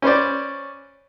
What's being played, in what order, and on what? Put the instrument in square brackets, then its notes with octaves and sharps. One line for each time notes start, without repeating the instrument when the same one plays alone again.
[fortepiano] C#4 B4 C5 D5